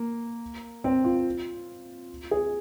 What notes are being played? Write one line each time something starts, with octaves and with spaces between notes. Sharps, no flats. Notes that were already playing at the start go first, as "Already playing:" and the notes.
Already playing: A#3
C4
F4
G#4